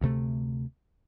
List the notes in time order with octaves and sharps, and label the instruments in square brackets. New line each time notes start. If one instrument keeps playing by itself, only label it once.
[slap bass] D2 C3 A3